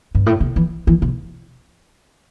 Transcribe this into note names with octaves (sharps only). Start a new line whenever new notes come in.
G2
A2
C3
E3
E3
C3